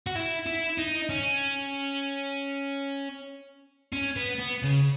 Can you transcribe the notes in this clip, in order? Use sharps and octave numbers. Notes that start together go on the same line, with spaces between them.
F#4
E4
E4
D#4
C#4
C#4
B3
B3
C#3